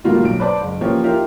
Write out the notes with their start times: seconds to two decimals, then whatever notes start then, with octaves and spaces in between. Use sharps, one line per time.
0.04 A2 D#3 G3 A#3 F4 F#4
0.24 B1 D7
0.40 B4 C5 D5 A5 B5
0.61 F#1
0.81 E3 F3 A#3 C#4 G4 C#5
1.03 D#4 F4 G4 A#4 E5 F5